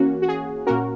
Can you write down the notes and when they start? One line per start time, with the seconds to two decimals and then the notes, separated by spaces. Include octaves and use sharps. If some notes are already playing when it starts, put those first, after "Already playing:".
Already playing: E3 A#3 C#4 F#4
0.22 F#4
0.28 G#4
0.67 A#2 A#3 C#4 F#4 A#4